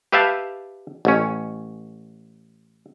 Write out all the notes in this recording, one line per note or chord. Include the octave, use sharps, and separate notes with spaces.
G4 B4 E5 F5 G5 A5
A1 C#4